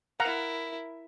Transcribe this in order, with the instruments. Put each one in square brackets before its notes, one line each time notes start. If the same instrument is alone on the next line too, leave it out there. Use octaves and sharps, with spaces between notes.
[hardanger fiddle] E4 A#4 [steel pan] F5 F#5 A#5